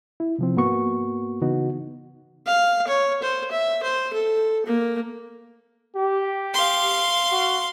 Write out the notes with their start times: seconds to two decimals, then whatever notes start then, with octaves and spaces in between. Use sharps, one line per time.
0.20 E4
0.38 C3 F3 C4
0.56 G#2 A#3 B3 F#4 C#6
1.41 C#3 E3 B3 D#4 F#4
2.47 F5
2.87 C#5
3.23 C5
3.51 E5
3.83 C5
4.13 A4
4.66 A#3
5.96 G4
6.54 F5 C6
7.31 F#4